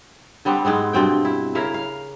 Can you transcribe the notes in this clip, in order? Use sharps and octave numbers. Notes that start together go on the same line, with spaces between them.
D3 G3 B3 C4
G#2 G#3 B3 C4
G2 B2 C4 G5
E4
C#3 E4 A#4 F5
F5